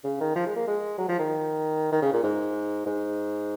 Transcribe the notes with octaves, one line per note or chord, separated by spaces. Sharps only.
C#3
D#3
F3
G#3
A#3
G#3
F#3
F3
D#3
D#3
C#3
A#2
G#2
G#2